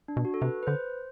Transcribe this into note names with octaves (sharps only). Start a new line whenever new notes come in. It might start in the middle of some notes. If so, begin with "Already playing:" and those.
D4
B2
F#4
A4
C3 B4
B4
D3 C5